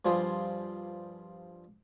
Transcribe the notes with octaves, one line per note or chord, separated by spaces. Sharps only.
G2 F3 G3 F4 G#4 C5